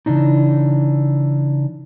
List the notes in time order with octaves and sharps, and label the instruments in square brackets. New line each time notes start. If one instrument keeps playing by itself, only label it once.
[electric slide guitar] C#3 E3 D4 D#4